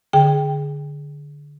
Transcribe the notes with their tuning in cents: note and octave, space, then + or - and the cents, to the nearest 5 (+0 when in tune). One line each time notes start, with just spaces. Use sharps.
D3 +0 G#4 +5 G5 +5